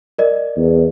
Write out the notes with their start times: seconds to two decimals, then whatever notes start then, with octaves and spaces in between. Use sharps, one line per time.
0.19 A#4 D5 D#5
0.57 E2